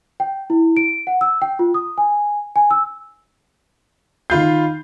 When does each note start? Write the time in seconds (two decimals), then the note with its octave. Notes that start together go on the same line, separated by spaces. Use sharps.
0.20 G5
0.50 E4
0.77 D7
1.07 F#5
1.21 E6
1.42 G5
1.59 F4
1.74 D#6
1.98 G#5
2.56 G#5
2.71 E6
4.30 D#3 F4 B5 G6 C7